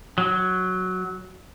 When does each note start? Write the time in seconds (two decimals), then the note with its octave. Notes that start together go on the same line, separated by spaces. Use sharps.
0.18 F#3